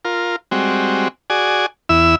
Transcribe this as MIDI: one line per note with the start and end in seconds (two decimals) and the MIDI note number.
0.05 0.36 65
0.05 0.36 70
0.51 1.08 55
0.51 1.08 56
0.51 1.08 60
0.51 1.08 66
1.30 1.66 66
1.30 1.66 68
1.30 1.66 74
1.30 1.66 80
1.89 2.15 40
1.89 2.15 64
1.89 2.15 76
1.89 2.15 88